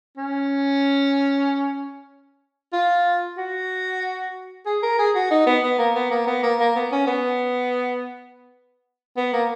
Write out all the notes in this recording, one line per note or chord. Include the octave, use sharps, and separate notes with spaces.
C#4
F4
F#4
G#4
A#4
G#4
F#4
D#4
B3
B3
A#3
B3
A#3
B3
A#3
A#3
B3
C#4
B3
B3
A#3